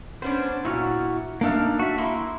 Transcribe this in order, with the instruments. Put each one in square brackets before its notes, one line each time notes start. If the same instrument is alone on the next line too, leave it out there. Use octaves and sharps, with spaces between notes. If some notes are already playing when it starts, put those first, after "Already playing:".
[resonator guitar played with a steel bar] B3 C#4 D4 [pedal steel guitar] C5
[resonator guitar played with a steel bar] A#2 [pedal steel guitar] E4 F#4 F6
[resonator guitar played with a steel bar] A3 D4 F5 [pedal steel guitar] A#3 D#4 F6
[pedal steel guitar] F#4 E5
[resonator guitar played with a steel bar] A#3 [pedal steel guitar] E4 B5 C6